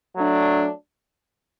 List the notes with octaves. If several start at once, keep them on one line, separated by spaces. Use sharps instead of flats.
F#3 A3 D4